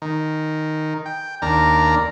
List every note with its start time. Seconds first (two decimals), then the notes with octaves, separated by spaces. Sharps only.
0.02 D#3
1.06 G5
1.42 D#2 D4 A#4 A#5